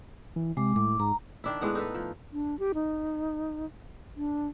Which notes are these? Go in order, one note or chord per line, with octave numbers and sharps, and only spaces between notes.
E3
C3 G#3 D6
A2 D6
G#2 A#5
D#3 D4 E4
A2 G#3 B3 F#5
D#4 A4 B4
F3
D4
G4
D#4
D4